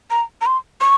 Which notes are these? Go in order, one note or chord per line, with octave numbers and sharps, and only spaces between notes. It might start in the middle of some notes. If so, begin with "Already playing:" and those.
A#5
A#5
C6
C#6